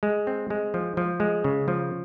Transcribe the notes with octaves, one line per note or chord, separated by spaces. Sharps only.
G#3
C4
G#3
F3
F3
G#3
C#3
F3